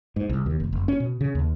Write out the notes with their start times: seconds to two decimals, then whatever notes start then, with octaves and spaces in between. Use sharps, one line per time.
0.16 G#2
0.29 C2
0.46 D#2
0.60 F1
0.73 F#1
0.88 C#4
1.00 B2
1.21 C#3
1.35 D#2